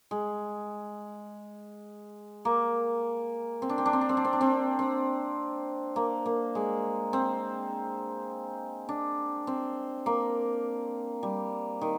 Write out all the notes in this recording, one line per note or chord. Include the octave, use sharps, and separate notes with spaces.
G#3
A#3
C4
D4
C4
D4
C4
D4
C4
D4
C4
D4
C4
C4
A#3
A#3
G#3
C4
D4
C4
A#3
G3
D#3